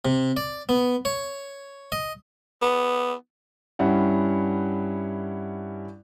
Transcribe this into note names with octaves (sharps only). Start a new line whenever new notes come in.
C3
D5
B3
C#5
D#5
B3
G2 C#4 E4 F#5